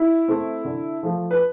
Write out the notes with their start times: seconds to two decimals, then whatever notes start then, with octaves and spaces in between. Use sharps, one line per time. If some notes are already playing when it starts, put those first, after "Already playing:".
Already playing: E4
0.28 A3 C4
0.65 D3
1.03 F3 A3
1.31 B4